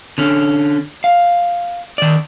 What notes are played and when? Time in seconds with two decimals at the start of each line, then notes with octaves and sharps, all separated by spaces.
0.18 D3 C#4
1.04 F5
1.98 D#3 D5